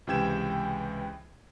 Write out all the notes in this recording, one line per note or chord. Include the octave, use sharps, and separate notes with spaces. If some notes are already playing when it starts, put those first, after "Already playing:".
C#2 C3 E3 G5 G#6 E7